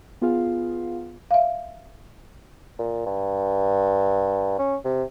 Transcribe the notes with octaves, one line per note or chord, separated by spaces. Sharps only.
B3 F4 G#4 F5
E5 F5
A#2
G2
C#4
C3